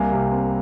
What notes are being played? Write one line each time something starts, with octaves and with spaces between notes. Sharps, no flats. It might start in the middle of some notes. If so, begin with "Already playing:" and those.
Already playing: C2 A#3 F5 G#5
C3
C4